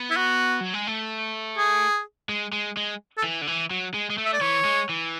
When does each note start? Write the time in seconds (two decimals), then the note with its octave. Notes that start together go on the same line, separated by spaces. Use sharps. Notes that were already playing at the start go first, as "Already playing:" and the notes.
Already playing: B3
0.10 E4
0.17 F#4
0.61 F#3
0.74 G#3
0.87 A3
1.58 G#4
2.29 G#3
2.53 G#3
2.77 G#3
3.18 A4
3.23 E3
3.41 D3
3.47 E3
3.71 F#3
3.94 G#3
4.10 G#3
4.18 A3
4.25 E5
4.33 D5
4.41 E3 C#5
4.65 G#3
4.89 E3